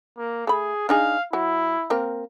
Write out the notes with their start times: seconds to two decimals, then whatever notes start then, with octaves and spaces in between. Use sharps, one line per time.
0.18 A#3
0.47 A3 G#4 B5
0.89 D4 D#4 G#4 F5
1.33 F#3 E4
1.90 A#3 C4 A#4